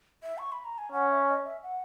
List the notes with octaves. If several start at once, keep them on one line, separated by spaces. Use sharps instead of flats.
E5
C#6
B5
A#5
G#5
C#4 F#5
E5
D#5
E5
F#5